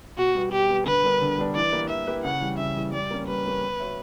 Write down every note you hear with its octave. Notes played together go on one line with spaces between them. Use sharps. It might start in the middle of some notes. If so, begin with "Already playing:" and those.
B2 F#4
G3 B3
B2 G4
G3 B3
D3 B4
G3 B3 D4 A#4
D3
G3 B3 D4 A#4
E3 D5
A#3 E4 G4 B4
E3 E5
A#3 E4 G4 B4
C#3 F#5
E3 G3
C#3 E5
E3 G3
G3 D5
A#3 C#4
G3 B4
A#3 C#4
B3
F#4 C#5 E5